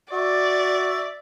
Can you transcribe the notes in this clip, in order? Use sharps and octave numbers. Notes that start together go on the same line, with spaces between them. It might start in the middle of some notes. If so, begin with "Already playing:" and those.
F#4 D5 E5 C#6